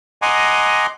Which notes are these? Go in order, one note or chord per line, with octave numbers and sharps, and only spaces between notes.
D#5 F#5 G#5 A#5 C6 D6